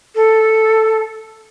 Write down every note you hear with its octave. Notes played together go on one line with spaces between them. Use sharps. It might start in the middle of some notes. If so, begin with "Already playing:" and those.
A4